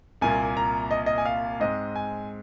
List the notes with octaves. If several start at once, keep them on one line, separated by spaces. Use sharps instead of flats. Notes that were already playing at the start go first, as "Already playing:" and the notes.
C2 A#2 A#3 G#5
A#5
D#5
D#5
G#5
F5
G#2 G#3 C4 D#5
G#5